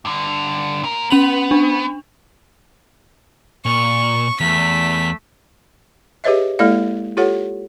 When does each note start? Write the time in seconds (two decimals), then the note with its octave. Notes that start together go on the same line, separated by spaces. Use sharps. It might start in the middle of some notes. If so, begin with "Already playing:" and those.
0.05 G2 D3
0.83 A#2 A#4
1.10 B3 C#4 F7 F#7
1.51 D4
3.65 A#2 C#6
4.40 E2 A3 B6
6.24 G4 G#4 B4 C#5 D#5 E5
6.59 G#3 A#3 E4 A4 D5 F5
7.17 F4 G4 A4 C#5 F#5